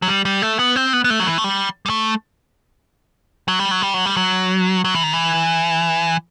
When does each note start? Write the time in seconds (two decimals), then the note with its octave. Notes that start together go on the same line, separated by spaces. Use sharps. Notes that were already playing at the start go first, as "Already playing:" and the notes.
0.02 F#3
0.08 G3
0.25 G3
0.42 A3
0.59 B3
0.76 C4
0.93 B3
1.04 B3
1.10 A3
1.20 F#3
1.27 E3
1.38 A3
1.44 G3
1.86 G3
1.90 A3
3.48 F#3
3.59 G3
3.71 F#3
3.82 G3
3.94 F#3
4.06 G3
4.17 F#3
4.84 F#3
4.94 E3
5.03 D#3
5.13 E3